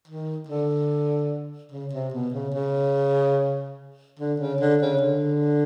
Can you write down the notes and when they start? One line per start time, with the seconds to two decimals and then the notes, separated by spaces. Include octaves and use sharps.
0.08 D#3
0.48 D3
1.72 C#3
1.93 C3
2.14 B2
2.34 C#3
2.54 C#3
4.20 D3
4.40 C#3
4.61 D3
4.82 C#3
5.01 D3